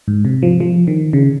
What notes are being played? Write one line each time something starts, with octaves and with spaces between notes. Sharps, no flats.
G#2
C3
F3
F3
D#3
C#3